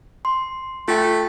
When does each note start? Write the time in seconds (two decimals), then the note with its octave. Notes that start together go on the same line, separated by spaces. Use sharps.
0.25 C6
0.88 A3 F4 G5